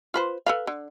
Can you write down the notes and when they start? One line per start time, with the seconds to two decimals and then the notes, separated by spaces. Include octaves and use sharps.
0.14 F4 B4 C5
0.46 A4 B4 F5
0.67 D3